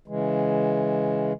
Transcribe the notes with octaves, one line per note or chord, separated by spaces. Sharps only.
C#3 E3 G#3